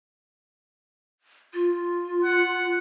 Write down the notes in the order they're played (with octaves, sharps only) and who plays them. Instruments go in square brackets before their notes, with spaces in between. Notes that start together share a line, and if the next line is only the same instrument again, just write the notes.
[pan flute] F4
[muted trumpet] F#5